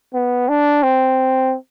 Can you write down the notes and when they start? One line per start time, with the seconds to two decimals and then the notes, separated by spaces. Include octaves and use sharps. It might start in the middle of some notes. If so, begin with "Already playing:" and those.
0.14 B3
0.49 D4
0.83 C4